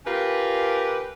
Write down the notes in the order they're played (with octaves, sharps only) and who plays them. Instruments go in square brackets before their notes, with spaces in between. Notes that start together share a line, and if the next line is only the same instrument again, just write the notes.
[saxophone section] C#4 F4 G4 A#4 B4